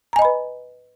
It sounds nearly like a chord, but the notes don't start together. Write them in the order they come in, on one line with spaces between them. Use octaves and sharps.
A#5 G#5 D#5 B5 B4